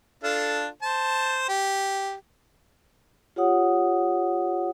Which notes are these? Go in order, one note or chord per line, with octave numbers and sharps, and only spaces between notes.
D4 F4 A4
C5 A5
G4
F4 G4 C#5 F#5 D#6